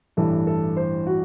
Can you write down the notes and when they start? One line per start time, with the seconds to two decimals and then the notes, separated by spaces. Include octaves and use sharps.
0.17 A1 G2 E3 A4
0.47 A4
0.77 C5
1.07 F#4